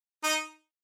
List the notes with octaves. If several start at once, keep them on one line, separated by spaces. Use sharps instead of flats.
D#4